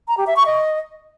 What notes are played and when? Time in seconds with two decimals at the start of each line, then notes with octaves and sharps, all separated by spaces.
0.08 A#5
0.17 G4
0.27 E5
0.36 C#6
0.46 D#5